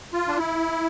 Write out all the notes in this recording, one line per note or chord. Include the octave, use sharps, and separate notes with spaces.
F4
D4
E4